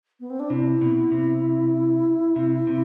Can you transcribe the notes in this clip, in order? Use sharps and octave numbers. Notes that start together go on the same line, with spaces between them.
B3
C4
D4
C3 E4
B2
C3
C3
C3